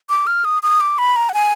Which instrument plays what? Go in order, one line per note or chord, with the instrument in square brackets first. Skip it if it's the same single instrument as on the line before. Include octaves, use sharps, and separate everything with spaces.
[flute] D6
F6
D#6
D#6
D6
B5
A#5
F#5
G#5